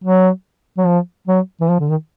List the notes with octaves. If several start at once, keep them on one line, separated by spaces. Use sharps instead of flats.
F#3
F#3
F3
F#3
E3
F3
D3
D#3